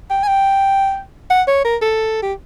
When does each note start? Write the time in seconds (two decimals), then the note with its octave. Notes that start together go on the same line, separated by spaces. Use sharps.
0.10 G5
0.24 G#5
0.28 G5
1.30 F#5
1.47 C#5
1.65 A#4
1.82 A4
2.23 G4